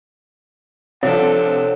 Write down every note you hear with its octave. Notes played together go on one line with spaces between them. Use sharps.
C3 F3 D4 A4 C#5 F#5